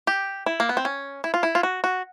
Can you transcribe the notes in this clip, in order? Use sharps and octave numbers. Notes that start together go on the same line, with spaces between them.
G4
E4
A#3
B3
C4
C#4
E4
F4
E4
F4
F#4
F#4